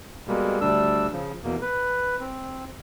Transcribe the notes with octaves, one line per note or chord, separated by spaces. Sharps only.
B2 G3 G#3 A#3
D2 G3 D4 E6
C#3 F3
E2 B2 A#3
B4
C4